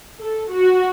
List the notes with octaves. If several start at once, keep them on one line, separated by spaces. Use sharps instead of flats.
A4
F#4